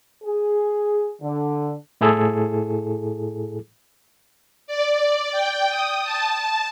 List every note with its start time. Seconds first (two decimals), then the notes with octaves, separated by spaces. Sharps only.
0.23 G#4
1.21 D3
2.01 A2 E4 G#4 A4
4.67 D5
5.32 G5
5.70 D#6
6.04 A5